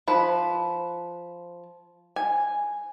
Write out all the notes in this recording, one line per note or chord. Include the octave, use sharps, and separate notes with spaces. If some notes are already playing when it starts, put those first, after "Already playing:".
F3 B4
G#5